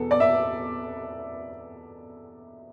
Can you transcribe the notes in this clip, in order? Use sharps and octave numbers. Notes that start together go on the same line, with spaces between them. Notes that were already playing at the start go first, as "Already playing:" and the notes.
Already playing: E2 B2 B3 A4
D5
E5